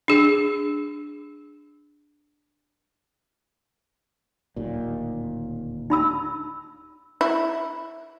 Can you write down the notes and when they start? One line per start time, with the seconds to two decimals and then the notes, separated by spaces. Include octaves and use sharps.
0.08 D4 G#4
4.56 D1 D#2 A#2
5.90 D#4 B5 E6
7.21 E4